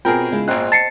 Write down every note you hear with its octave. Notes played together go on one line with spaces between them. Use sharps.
B2 C4 F4 G#4 A#4 G5
C#3 G#3 E4
G#1 A#2 C5 D#5 G5 F#6
A5 A6 C7 C#7